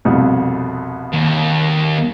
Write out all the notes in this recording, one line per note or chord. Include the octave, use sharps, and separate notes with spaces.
C2 F2 B2
D#2